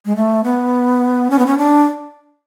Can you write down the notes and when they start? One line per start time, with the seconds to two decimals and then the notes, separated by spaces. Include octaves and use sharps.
0.05 G#3
0.16 A3
0.44 B3
1.30 C#4
1.39 B3
1.46 C#4
1.58 D4